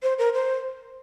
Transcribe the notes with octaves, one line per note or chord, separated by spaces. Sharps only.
C5
A#4
C5